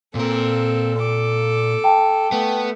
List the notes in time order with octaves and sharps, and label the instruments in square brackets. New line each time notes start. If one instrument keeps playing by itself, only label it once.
[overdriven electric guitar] A#2 A#4 [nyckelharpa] C4 A4
[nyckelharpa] A4 D6
[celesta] G5 A5
[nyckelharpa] A3 [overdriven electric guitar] B3